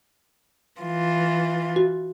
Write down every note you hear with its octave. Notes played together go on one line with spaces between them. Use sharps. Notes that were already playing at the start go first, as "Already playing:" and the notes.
E3 F4
F#4